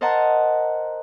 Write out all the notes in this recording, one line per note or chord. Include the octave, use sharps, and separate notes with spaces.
A#4 C5 D#5 F#5 A5 A#5